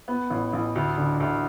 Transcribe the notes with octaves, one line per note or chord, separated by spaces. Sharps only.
B3
A1
A1
D2
D3
D2